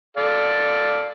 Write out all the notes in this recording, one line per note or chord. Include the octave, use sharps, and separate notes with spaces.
A4 D5 F5